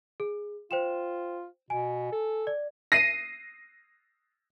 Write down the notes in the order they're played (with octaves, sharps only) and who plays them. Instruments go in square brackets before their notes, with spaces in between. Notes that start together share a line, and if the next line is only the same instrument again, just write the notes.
[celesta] G#4
[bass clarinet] F4 [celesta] C5 G5 E7
[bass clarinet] B2 [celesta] G#5
[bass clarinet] A4
[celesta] D5
[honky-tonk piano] A#6 C7 D#7